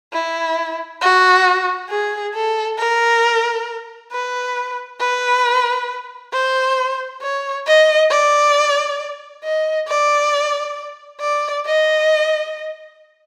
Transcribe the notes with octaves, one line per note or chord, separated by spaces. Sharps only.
E4
F#4
G#4
A4
A#4
B4
B4
C5
C#5
D#5
D5
D#5
D5
D5
D#5